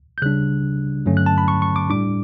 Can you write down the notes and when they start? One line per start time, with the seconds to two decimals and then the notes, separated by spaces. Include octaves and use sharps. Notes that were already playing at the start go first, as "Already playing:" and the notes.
0.18 G6
0.22 C#3 G3 D4 F#6
1.06 G2 D3 F#3 A3 C#4
1.17 F#6
1.26 A5
1.38 B5
1.48 C#6
1.62 C#6
1.76 D6
1.90 A2 G3 D4 D6